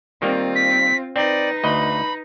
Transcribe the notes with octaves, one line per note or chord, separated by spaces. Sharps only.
D#3 G3 A#3 C4 F4
B6
C4 D#4 B4 D5
D2 D#5 B5